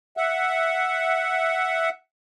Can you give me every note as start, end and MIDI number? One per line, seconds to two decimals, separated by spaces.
0.17 1.89 76
0.17 1.89 78